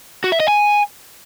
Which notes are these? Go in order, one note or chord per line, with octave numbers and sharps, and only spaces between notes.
F#4
E5
D#5
G#5